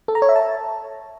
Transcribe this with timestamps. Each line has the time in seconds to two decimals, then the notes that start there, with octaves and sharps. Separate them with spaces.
0.08 A4
0.15 A#5
0.22 C#5
0.29 E5
0.36 A5